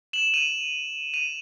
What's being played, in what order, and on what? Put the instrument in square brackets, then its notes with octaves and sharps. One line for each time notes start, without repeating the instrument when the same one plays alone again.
[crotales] E7 F#7
D#7 F7
D#7 F7